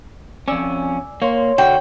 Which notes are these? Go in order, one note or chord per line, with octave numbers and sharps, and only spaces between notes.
F2 C#4 D5 G#5 E6
A#3 C#5 C6
D3 F#4 G5